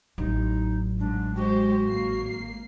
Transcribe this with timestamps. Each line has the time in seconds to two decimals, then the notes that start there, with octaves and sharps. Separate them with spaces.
0.18 A1 F#3 D#4
1.00 G#2 D4
1.36 G#3 F#4 G4 C5
1.84 G#1 A#3 C7